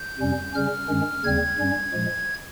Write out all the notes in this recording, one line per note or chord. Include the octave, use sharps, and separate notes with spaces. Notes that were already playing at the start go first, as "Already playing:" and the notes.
Already playing: G6
F2 C3 G3 C#4
C#3 G3 C#4 F6
G2 D#3 G#3 C#4
D#2 C#3 G3 C4 G#6
G2 G3 C#4
A#2 F3 G#3